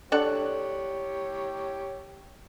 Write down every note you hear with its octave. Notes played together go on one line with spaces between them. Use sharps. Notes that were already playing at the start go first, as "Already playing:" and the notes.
D4 G4 A4 C#5 F#5